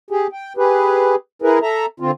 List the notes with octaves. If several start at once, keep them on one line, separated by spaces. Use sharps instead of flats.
G4 G#4
G5
G4 G#4 B4
E4 G#4 A#4 B4
A4 E5 A#5
D3 C4 F4